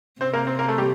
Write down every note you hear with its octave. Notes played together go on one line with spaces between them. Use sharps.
C3 C4 C5
A#3 A#4
C4 C5
A#3 A#4
A3 A4
G3 G4